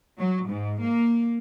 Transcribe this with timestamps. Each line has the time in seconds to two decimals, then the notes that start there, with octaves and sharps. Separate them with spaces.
0.19 F#3
0.48 G#2
0.81 A#3